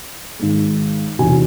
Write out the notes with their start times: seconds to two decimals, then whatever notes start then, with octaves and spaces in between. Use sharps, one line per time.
0.39 G#1 G#2 G#3
1.19 F1 E2 B2 G#5